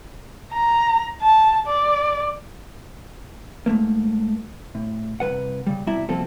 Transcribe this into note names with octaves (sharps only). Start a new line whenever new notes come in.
A#5
A5
D5
G#2 B2 A3 A#3
A2
C2 B2 B4 F#5
C#3 G3
C2 B2 G3 E4 E5 A#5
C2 B2 F3 A#3 C4 A4